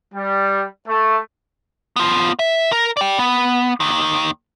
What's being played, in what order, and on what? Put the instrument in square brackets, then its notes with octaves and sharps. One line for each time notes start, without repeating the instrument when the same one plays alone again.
[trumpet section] G3
A3
[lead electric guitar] B3 F4
E5
A#4
D5 G5
B3
D#2 D#3